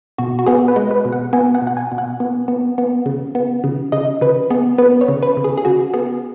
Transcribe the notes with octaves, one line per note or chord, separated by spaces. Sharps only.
B2 F#4
F#4
B3 G#4
B4
G#3
B4
B2
F#5
B3 G#5
F#5
B2
F#5
G#5
B2
F#5
B3
B3
B3
C#3
B3
C#3
C#3 D#5
C#3 B4
B3 G#4
B3 B4
C#5
C#3
B4
C#3
G#4
G#4
C#3 F#4
B3 G#4